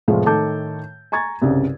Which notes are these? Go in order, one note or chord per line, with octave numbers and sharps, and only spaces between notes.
F1 A2 F3 G#3 F5
A2 D#3 A4 A5 D6 G6
G#5 A#5 C#6 G#6 A6
C2 G2 C#3